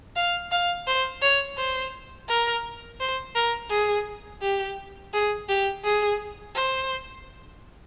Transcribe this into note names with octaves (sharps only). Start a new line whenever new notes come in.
F5
F5
C5
C#5
C5
A#4
C5
A#4
G#4
G4
G#4
G4
G#4
C5